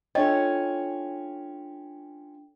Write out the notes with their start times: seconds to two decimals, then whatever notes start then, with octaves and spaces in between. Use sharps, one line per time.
0.15 C#4 D4 F4 A4 C#5 D#5 G5